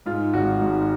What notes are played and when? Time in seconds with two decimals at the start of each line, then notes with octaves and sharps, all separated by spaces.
0.06 G#2 F4
0.34 G#1 F#4
0.61 G#2